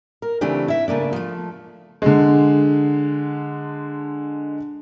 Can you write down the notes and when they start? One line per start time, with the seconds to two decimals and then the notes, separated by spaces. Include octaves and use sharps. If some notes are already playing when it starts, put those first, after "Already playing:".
0.22 A#4
0.41 C#3 E3 A3 C4 D4 G4
0.68 E4 E5
0.88 C#3 A3 A#3 D4
1.13 F3 A3
2.02 D3 G#3